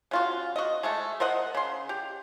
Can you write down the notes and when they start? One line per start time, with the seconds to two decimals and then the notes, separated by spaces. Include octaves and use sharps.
0.11 C#3 F4 F#4
0.56 F#4 D#5
0.83 G#3 A3 E5
1.20 A#4 C5 D#5 F#5
1.55 C#3 C6
1.89 G4